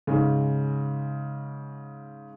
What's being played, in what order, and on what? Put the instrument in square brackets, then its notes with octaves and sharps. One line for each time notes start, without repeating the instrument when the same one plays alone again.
[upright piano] G#2 C#3